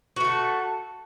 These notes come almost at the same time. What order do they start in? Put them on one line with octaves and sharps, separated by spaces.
F#4 A3 A4